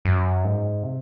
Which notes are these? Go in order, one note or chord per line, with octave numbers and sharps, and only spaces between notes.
F#2
G#2
C3